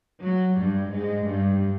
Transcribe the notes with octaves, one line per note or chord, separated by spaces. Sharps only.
F#3
G2 G3
G#2 G#3
G2 G3